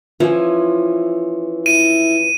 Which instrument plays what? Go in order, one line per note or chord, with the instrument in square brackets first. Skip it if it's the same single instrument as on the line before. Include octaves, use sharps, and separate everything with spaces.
[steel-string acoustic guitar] E3 C#4 [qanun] F3
[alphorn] E4 [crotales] D#7